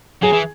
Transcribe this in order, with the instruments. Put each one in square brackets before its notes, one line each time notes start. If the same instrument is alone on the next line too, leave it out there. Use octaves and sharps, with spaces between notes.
[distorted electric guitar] F#3 [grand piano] G#4
[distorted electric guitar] E3